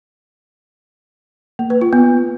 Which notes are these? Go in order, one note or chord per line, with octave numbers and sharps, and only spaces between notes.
A#3
B4
F4
B3